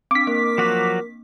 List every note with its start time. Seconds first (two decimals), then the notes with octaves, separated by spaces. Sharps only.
0.11 C4 D4 D6 B6
0.27 A#3 A#4
0.58 F3 F#3 F#4